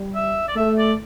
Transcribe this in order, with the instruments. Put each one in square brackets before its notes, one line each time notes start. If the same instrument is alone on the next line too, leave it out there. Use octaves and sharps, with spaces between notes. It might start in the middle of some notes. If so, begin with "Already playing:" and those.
Already playing: [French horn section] G3
[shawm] E5
D5
[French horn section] A3 [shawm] E5
[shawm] D5